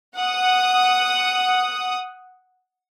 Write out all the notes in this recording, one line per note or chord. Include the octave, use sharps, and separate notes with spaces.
F#5 D#6